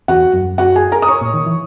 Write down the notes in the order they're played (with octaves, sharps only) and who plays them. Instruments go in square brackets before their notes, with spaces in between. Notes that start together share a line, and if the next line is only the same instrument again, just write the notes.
[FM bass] E2 [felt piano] F#4 F#5
[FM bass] F#2
[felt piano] F#4 F#5
G#4 G#5
A#4 A#5
D#6
C#5 C#6
[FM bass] A#2
D#3
E3